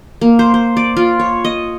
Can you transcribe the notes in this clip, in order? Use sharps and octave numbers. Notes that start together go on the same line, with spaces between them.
A#3
C5
C5
D5
F4
C#5
D#5